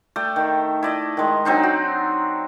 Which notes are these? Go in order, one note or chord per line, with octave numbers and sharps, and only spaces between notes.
A3 D5 G5
D#3
E4 D5 D#5
D#3 G#3
F#3 C4 D4 D#4
F#4